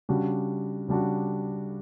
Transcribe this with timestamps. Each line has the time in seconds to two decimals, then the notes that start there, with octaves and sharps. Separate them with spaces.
0.09 C#3 G3 D4 F#4
0.88 C#3 G3 D4 F#4